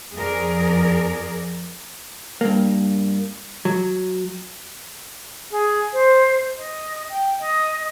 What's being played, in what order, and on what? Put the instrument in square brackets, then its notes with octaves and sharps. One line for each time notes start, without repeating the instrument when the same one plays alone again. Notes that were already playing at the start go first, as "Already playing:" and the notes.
[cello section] F2 G#4 A#4 D5
[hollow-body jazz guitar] G2 A#3
F#3
[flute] G#4
C5
D#5
G5
D#5